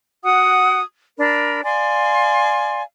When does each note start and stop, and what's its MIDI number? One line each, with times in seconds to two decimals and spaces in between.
0.24 0.81 66
0.24 0.81 78
0.24 0.81 87
1.18 1.61 62
1.18 1.61 70
1.18 1.61 83
1.64 2.81 74
1.64 2.81 77
1.64 2.81 80
1.64 2.81 84